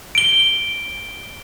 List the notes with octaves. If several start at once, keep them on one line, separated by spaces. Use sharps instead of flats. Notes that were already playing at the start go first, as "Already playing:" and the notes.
D7 G7